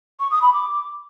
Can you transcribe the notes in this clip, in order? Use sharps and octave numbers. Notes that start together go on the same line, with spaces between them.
C#6
D#6
B5
D6